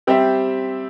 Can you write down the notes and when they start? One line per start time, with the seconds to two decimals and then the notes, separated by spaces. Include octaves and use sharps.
0.07 G3 C4 G4 C5 E5